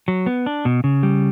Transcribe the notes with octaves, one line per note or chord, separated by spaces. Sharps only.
F#3
B3
D4
B2
C#3
G3